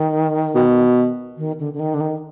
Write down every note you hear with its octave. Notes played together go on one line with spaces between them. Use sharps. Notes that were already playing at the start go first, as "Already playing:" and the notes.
Already playing: D#3
B2
D#3
D3
D3
D#3
D3
D#3